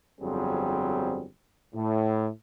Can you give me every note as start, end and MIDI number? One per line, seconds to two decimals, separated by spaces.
0.20 1.26 31
0.20 1.26 41
0.20 1.26 54
0.20 1.26 55
0.20 1.26 60
0.20 1.26 68
1.74 2.28 45